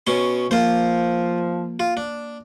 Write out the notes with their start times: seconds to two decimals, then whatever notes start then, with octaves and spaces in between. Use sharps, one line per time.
0.07 B2 C#4 C6
0.51 F3 A#3 F4 C5
1.80 F4
1.97 D4